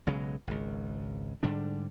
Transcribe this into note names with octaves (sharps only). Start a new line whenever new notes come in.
B1 C#3 F#3 G#3
G#1 C#2
G#2 D3 G3 D4